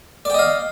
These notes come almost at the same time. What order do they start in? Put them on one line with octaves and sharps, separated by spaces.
D5 G5 D#5 F5